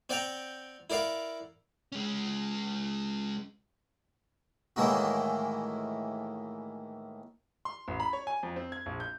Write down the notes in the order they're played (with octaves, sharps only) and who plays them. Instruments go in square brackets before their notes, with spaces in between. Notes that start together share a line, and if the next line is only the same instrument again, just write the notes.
[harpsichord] C4 D5 F#5 G5 A#5
E4 A#4 D5 F5 F#5
[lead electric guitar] G#3 C#4
[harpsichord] A2 D#3 E3 G#3 A#3 F#4
[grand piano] C6
A1
B5
C#5
G#5
F2
C4
G#6
A#1
G6